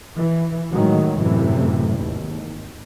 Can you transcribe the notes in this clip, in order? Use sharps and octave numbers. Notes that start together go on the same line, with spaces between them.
E3
A2 D#3 F#3 G#3
F#2 A2 C3 E3
G#1 D#2